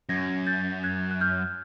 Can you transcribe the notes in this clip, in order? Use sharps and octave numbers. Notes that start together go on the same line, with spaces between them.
F#2 G#6 A#6
G6 A6
F#6 G#6
F#6
F6 G6